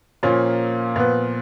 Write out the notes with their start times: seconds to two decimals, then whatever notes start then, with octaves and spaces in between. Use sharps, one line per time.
0.23 A#2 F3 A#3 C#4 F4
0.96 A#2 F3 B3 F4 B4